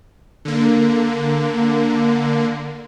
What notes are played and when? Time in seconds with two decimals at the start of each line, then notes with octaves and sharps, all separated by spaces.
0.45 D3 A#3